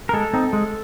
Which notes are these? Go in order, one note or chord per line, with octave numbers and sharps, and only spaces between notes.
A#4
G#3 A4
C4 D#4
G#3